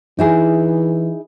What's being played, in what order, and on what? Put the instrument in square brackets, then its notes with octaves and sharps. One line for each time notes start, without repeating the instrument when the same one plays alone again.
[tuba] E3 [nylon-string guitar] D#4 E4 G#4